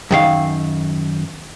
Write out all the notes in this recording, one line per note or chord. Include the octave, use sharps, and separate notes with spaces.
F#2 D#3 F5